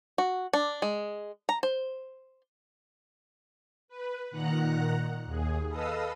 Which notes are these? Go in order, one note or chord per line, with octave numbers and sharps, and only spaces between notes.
F#4
D4
G#3
A#5
C5
B4
A#2 D#3 F#5 A#5 F#6
D#2 G#4
A4 B4 D#5 F5 D#6 E6